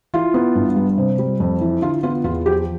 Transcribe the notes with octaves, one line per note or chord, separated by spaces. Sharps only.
E3 F4
B3
G2
G3
C3
G3
F2
E3
D3 F4
B3 F4
E2 F4
F3 G4